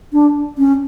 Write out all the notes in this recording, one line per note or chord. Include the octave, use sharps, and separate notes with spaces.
D4
C#4